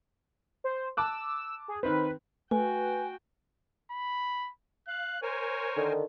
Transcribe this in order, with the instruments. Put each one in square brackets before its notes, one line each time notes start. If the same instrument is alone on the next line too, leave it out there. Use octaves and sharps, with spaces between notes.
[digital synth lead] C5
[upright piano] A5 D6 F#6 [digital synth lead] E6
[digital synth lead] G#4
[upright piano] D#3 C4 [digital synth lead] B4
[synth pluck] A3 [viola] F#4 G5 [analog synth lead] B4 [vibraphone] G#5
[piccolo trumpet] B5
[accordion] F5 [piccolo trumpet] F#6
[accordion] A#4 C5 G#5 [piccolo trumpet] C#5
[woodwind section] D3 D#3